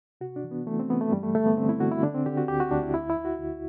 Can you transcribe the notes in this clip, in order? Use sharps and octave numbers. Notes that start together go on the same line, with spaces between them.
C3 F#4
D4
E3
B3
E3 A3
C4
E3 B3
A3
G2 G3
A3
D3 A3
B3
D3 C4
E4
D3 F#4
E4
D3 D4
C4
D3 G4
F#4
D2 G4
F#4
D2 D4
E4
D2 E4
E4
D2
F#4
D2